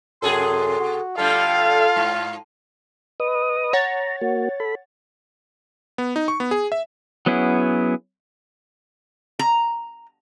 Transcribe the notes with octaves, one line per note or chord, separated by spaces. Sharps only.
F#2 C3 G#4 A4 C6
F#4
D3 G3 A3 F4 A4 F5
G#2
B4 D#5 D#6
C#5 F#5 A#5 A6
A#3 F#4
A4 B5
B3
D#4
C#6
B3
G#4
E5
F#3 B3 C#4 E4 G#4
A#5